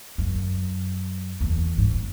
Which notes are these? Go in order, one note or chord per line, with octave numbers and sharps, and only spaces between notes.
F#2
E2
G#2